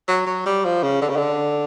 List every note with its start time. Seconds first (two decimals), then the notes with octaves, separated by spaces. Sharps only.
0.08 F#3
0.27 F#3
0.46 G3
0.65 F3
0.83 C#3
1.02 D3
1.09 C#3
1.17 D3